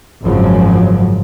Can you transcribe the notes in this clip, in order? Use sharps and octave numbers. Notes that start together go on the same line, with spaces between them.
G#1 F#2 C#3 F3 F#3